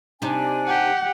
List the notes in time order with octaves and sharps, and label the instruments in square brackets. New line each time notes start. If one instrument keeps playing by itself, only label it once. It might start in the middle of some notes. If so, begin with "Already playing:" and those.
[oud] C3 D#4 [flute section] D4 G#5
[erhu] G4 [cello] F#5